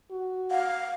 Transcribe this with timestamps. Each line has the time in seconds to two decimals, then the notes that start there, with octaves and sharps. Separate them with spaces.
0.11 F#4
0.51 F5 F#5